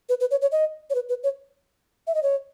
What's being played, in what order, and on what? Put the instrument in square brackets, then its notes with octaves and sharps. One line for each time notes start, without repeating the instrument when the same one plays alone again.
[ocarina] B4
B4
C#5
C#5
D#5
C#5
B4
B4
C#5
E5
D#5
C#5